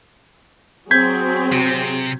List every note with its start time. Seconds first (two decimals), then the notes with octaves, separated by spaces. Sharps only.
0.91 F#3 C4 G#4 G6 G#6 B6
1.52 C3